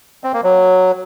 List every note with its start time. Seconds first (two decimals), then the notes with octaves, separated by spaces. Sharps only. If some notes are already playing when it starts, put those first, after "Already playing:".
0.24 C4
0.34 A#3
0.44 F#3